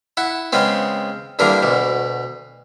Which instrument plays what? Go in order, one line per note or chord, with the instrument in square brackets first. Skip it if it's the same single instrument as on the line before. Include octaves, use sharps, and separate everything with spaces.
[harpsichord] E4 F#5
C#3 G#3 B3 C4
G2 D3 E3 A#3 D4
D2 B2